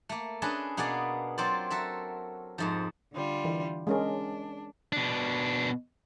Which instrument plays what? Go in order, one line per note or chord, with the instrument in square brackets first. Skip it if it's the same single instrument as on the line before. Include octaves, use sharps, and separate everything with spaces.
[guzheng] A3 A#3
C#4 D4 G#4 B4 D#5 A5
B2 A#3 B3 G#4 D5 F5
F#3 C4 F4 C5 D5
F#4 A4 A#4 E5
F2 G#2 F3
[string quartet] D3 G3 F4
[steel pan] E3
[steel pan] G#3 C#4 A#4 [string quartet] D4
[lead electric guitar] B2 D4